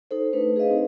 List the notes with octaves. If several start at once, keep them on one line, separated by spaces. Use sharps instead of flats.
D#4 A4 C5
A3 D4 B4
G#4 B4 C5 D#5 F5
C4 D#4